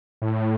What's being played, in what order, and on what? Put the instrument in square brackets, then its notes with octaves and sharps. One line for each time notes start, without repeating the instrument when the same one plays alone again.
[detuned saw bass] A2